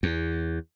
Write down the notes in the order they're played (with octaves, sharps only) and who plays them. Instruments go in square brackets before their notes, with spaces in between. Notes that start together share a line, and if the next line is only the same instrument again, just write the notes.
[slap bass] E2